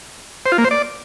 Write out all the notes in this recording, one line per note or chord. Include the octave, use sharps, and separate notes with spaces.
C5
F4
A#3
C5
D5